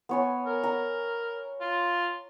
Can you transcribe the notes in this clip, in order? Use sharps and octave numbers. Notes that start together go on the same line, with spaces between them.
B3 C#5 G#5
A#4
A#5
F4